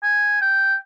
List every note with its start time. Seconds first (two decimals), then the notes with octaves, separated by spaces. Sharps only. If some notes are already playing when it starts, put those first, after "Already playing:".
0.03 G#5
0.41 G5